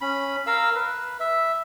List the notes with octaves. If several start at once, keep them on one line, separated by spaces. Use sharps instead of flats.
C#4 B5
A#4 F5 E6
B4
E5